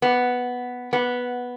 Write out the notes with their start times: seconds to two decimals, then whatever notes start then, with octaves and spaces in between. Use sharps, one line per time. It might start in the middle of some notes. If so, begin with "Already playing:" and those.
0.02 B3
0.93 B3